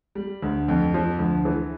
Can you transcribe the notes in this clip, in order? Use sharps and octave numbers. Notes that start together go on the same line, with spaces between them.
G3
D2
F2
F3
D2
E3